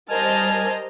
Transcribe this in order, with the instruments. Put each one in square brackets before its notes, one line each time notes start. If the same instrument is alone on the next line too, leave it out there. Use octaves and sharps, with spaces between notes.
[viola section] G3 [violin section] A#4 C5 D#5 [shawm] G#5 [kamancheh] A5 F6